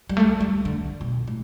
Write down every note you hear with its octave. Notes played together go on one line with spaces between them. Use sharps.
G3
A3
G3
D3
B2
A2